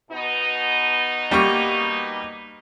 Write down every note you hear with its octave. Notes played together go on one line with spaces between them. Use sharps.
B2 B3 D#4
G3 A#3 C#6